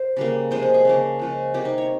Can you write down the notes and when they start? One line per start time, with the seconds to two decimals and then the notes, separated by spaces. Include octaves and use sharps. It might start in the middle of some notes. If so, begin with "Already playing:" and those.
Already playing: C5
0.17 C#3 G3 A#3
0.51 C3 F3 G#3 C5
0.63 G#4
0.74 G#4
0.85 C#3 F3 A#3
1.19 C#3 F3 G#3
1.54 C3 G3 A#3 G4
1.65 D#4
1.78 C#5